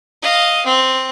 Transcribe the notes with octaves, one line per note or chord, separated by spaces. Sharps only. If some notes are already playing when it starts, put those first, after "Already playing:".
D#5 F5
C4